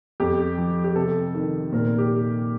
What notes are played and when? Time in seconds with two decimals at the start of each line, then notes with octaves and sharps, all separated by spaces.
0.20 F2 G4
0.58 F3
0.84 G4
0.96 C3 A4
1.35 D#3
1.72 A#2 A#4
1.98 G4